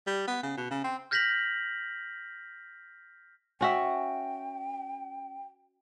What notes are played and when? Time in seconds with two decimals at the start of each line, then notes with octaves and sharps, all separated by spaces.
0.07 G3
0.27 B3
0.43 C#3
0.57 B2
0.71 C#3
0.84 C4
1.11 F6 G6 A#6 B6 F7 F#7
3.61 C#4 F#4 E5 G5